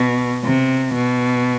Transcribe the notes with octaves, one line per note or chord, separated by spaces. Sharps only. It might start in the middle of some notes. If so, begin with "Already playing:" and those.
Already playing: B2
C3
B2